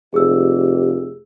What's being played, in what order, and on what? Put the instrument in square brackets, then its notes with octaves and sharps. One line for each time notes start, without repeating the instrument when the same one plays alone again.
[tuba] F1 [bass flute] G4 [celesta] G#4 E6